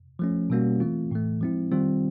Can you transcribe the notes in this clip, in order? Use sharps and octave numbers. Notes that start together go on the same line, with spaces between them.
F3 A3 C#4
B2 G3 A#3 C#4 F#4
E3 A3 C4 F4
A2 E3 A3
F3 G#3 C4 E4
D#3 G3 C4 F4